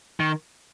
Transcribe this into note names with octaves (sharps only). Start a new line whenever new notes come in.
D#3